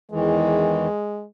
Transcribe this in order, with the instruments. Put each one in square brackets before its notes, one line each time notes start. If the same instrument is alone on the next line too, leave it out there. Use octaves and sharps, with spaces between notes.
[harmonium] E2 D#3 E3 [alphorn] G#3